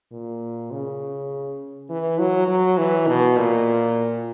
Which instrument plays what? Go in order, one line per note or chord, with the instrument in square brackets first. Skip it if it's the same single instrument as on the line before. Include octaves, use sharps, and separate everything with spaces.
[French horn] A#2
C#3
E3
F#3
F#3
E3
B2
A#2